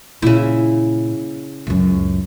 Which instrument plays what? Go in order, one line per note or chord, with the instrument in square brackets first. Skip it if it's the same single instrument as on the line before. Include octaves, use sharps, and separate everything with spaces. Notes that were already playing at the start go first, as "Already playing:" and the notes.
[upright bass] A#2 [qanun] C#3 E4
[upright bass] C#2 F#2